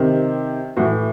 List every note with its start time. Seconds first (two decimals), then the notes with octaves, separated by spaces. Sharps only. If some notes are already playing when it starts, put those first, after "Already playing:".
Already playing: C3 D#3
0.77 A2 E3 F#4